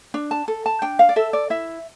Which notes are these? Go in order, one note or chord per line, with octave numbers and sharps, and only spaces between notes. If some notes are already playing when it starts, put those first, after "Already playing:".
D4
A5
A4
A5
D4 G5
F5
D5
A4 E5
D5
E4 E5